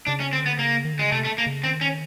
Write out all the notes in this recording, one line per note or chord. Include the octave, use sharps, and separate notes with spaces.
C#3 D4
C#4
D3 C4
B3
C#3 A#3
D#3
D3
C#3 G#3
C3 A3
A3
A#3
C#3
D#3 C4
C#4